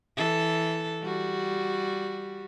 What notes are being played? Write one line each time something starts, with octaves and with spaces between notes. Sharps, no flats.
E3 A4
G3 F#4